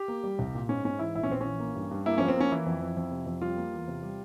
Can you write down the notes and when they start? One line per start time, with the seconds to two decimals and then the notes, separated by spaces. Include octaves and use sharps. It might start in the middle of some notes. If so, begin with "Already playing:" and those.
Already playing: G4
0.08 A#3
0.24 G3
0.39 C2
0.55 A#2
0.69 G#2 C#4
0.85 G#2 C#4
0.99 E3 E4
1.15 A#1 E4
1.23 C#4
1.30 A#1 C4
1.41 E3 C#4
1.60 A#3
1.75 G2
1.91 G2
2.06 A#3 E4
2.18 F3 C#4
2.28 C4
2.36 A#3 C#4
2.52 E3 E4
2.66 F2
2.81 F2
2.97 F2
3.11 C3
3.26 F2
3.42 G3 F4
3.57 A#3
3.73 E2
3.88 C3
4.03 G3